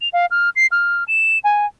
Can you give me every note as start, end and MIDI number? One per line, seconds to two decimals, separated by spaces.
0.01 0.09 101
0.13 0.26 77
0.31 0.50 89
0.56 0.66 96
0.72 1.04 89
1.08 1.39 100
1.44 1.66 80